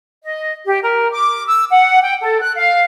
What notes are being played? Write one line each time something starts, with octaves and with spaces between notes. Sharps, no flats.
D#5
G4
A#4
D6
E6
F#5
G5
A4
F#6
F5